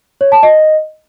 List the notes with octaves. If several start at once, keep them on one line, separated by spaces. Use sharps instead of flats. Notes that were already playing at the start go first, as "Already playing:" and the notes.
C#5
A5
D#5